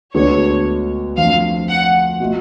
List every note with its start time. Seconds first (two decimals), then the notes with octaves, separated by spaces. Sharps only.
0.14 D2 D3 G#3 B3 D4 C#5
1.17 F2 F3 A3 D4 F4 F5
1.69 F#5
2.20 B2 A3 F4